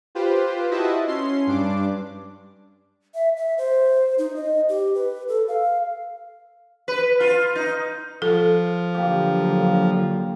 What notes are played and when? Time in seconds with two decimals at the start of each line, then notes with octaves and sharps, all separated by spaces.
0.15 F4 G4 B4 C5
0.71 E4 F#4 D#5 E5 A5
1.07 C#4 C6 C7
1.47 G2 D4 D6
3.14 E5
3.37 E5
3.58 C5
4.18 D#4
4.36 D#5
4.69 G4
4.95 B4
5.28 A4
5.48 F5
6.88 B4
7.20 F4
7.55 D#4
8.22 F3 A4
8.95 D3 F#3 A#3 G4